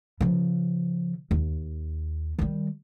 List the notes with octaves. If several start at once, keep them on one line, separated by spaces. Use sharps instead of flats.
C#3 F3
D#2
D#3 G3